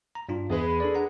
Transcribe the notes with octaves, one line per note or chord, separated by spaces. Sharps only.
A#5
G2 D4 F4
E2 G#3 G#4 B4
D4 A4 D5
F#5 A#5